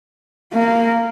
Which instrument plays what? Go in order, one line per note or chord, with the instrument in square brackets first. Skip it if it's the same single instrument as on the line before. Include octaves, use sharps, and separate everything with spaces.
[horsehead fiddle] A#3